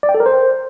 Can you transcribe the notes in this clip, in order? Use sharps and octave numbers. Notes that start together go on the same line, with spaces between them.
D5
G5
A4
A#4
C5